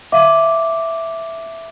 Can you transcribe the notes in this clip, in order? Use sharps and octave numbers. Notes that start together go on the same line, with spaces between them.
E5 F5 D6